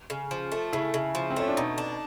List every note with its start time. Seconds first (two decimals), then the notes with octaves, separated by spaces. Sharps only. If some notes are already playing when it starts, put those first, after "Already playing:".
0.10 C#3
0.31 F3
0.52 A3
0.73 C#3 E4
0.94 C#3
1.15 F3
1.30 C4
1.36 A3 C#4
1.48 D4
1.57 B2 D#4
1.78 D4